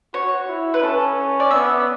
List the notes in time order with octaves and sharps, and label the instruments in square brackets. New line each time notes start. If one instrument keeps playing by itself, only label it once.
[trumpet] F#4 [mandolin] C#5
[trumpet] E4
[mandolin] B4
[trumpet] C#4 [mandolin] A4
[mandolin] D5
[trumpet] B3 [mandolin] E5